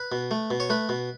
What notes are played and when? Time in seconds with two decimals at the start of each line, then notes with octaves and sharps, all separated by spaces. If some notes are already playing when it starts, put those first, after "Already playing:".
Already playing: B4
0.12 B2
0.31 A3
0.50 B2
0.60 C#5
0.70 A3 B4
0.89 B2